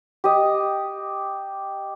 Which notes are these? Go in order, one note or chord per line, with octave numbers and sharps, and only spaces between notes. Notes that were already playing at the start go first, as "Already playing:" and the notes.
G4 D#5